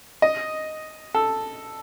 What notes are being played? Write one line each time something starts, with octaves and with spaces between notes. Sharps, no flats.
D#5
A4